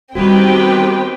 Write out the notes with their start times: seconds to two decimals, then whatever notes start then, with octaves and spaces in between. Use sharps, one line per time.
0.15 D#3 G3 B3 C4 F#4 G4 B4 G5